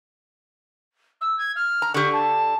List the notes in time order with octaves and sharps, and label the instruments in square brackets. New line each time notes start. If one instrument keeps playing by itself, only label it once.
[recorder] E6
G#6
F6
[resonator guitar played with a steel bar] A#5
[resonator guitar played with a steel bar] D3 G4 [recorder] C#6
[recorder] A5